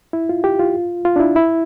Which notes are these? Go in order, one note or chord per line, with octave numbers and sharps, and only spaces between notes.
E4
F4
G4
F4
F4
D4
E4
E4